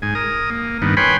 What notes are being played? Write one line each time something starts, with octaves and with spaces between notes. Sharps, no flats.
G#2 G#5
A#4 D#6
A#3
G2 D#3 B3
B4 C#5 G5 G#5 B5 C6